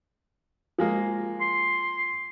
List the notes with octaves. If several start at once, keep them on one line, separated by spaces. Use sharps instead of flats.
F3 G#3 A#3
C6